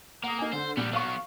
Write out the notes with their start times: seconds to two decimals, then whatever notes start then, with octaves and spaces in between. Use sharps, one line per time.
0.24 A#3 F#5 D#6
0.39 D#4 G#5
0.53 D3 C5
0.77 A#1 G3 B3
0.93 F#3 B3 F5 C#6